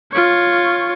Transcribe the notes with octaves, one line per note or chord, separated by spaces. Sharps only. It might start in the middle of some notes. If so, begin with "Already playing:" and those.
F4 C#5